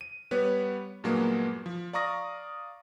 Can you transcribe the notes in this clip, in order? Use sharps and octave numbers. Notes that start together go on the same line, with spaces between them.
D#7
G3 B3 B4 C#5
G2 A#2 F#3 G#3 A#3 B3
F3
D5 F5 A#5 C#6 D#6 A#6